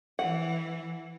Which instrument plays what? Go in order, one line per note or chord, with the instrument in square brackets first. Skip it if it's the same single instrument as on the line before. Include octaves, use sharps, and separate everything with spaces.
[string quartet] E3 [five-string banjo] F#5